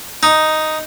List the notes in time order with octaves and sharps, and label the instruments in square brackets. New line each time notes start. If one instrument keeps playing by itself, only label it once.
[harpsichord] D#4